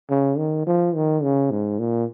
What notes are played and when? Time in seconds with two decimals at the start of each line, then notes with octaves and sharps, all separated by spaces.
0.10 C#3
0.38 D#3
0.67 F3
0.95 D#3
1.23 C#3
1.51 G#2
1.79 A#2